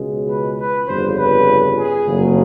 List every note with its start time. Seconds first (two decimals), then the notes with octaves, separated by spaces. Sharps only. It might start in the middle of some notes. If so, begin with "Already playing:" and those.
Already playing: C#2 B2 G#3
0.28 B4
0.58 B4
0.88 G1 F2 C#3 C5
1.18 B4
1.78 G#4
2.07 F#1 F2 C#3 F#3